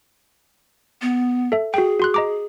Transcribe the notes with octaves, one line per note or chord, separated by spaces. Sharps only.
B3
A4 E5
F#4 G#4 G5
F#4 C6 F#6
D#5 A#5 D6